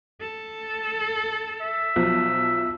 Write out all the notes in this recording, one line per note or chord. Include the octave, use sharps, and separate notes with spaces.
A4
E5
B1 F3 F#3